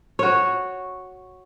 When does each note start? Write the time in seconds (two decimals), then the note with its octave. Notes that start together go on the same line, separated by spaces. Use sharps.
0.19 F#4 C#5